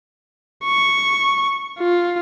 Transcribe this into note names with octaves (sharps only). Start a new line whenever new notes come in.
C#6
F4